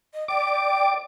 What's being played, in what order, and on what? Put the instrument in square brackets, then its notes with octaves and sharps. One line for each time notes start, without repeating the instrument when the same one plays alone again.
[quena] D#5
[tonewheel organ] D5 D6 [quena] G5